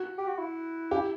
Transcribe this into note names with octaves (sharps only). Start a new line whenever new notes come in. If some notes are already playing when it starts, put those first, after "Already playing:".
Already playing: F#4
G4
F#4
E4
G4